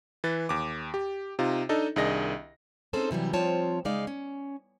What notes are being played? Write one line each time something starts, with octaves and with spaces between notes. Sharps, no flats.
E3 B4 A6
D#2 D6
G4
C3 D#4 F4
D4 D#4 A4 D#5
C2 D#3 D4 G#4 D#5 A#6
C4 C#4 D#4 G#4 A4 C5
C3 E3 F#3 G3
F3 C4 F4 C#5 A5
C#3 G#3 D#4 D5 F5
C#4